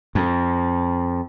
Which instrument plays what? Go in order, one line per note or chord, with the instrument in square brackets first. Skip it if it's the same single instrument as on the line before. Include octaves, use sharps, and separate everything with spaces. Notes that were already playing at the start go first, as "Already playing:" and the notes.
[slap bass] F2